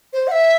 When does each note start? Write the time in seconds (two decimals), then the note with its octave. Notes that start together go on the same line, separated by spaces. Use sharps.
0.13 C5
0.28 F#5
0.31 E5